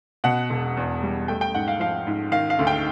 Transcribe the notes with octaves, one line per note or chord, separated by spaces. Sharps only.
B2 F#5
E1
E2
G3
A3 G5
G5
G#2 F#5
F5
F3 F5
G#2
D#3 F5
F5
D2
G5